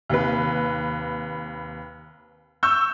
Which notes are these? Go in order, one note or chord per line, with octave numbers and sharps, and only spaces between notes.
D#2 C3 B4
C#6 E6 G6